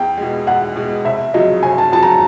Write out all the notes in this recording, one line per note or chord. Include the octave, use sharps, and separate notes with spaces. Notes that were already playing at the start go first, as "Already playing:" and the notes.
Already playing: E2 G5
B2 G#3
E2 F#5
B2 G#3
F1 E5
F2 C#3 F#3 D#5
F1 G#5
A5
F2 C#3 F#3 A5
A#5
A5